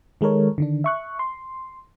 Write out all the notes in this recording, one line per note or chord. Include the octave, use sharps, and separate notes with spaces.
D#3 G#3 A4 A#4 C#5
D3 D#3 D4
E5 C#6 F#6
C6